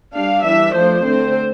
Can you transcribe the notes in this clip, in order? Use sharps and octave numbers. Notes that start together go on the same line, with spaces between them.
G3 D4 F5
E3 G3 D4 E5
F3 A3 D4 C5
D3 A3 C4 C5